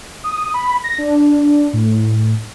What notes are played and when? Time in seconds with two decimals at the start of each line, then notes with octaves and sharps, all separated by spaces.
0.24 D#6
0.54 B5
0.84 A#6
0.98 D4
1.73 A2